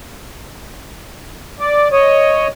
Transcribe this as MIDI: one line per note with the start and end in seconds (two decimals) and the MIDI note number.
1.60 1.88 74
1.92 2.48 73
1.92 2.48 75